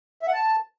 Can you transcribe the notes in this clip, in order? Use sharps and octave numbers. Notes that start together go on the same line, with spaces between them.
E5
F#5
A5